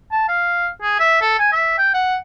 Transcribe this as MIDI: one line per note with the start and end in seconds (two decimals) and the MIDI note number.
0.12 0.25 81
0.29 0.68 77
0.82 0.98 68
1.00 1.18 76
1.22 1.36 69
1.39 1.50 80
1.52 1.76 76
1.78 1.92 79
1.94 2.17 78